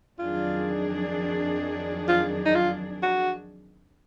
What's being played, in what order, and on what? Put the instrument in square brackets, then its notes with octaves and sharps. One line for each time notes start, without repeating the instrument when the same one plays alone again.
[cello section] F2 D#3 F#3 D4 G#4 [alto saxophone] F4
[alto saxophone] F4
D#4
F4
F#4